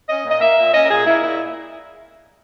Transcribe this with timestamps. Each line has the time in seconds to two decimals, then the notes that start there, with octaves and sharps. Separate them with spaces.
0.09 C#4 D#5
0.24 A#2
0.30 D#5
0.41 A#3 E5
0.57 A#2
0.74 C#4 D#5
0.85 A#4
0.91 A#2 G#4
1.06 A#3 E4
1.23 A#2 E4